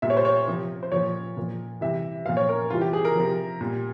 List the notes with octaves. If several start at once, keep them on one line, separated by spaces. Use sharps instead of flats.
A#2 G3 E5
C#5
C5
C#5
C3 F3
C5
A#2 F3 C#5
A#2 F3
C3 E3 G3 E5
A#2 F3 F5
C#5
A#4
C3 E3 G3 F4
G4
G#4
A#4
C3 F3
A#2 G3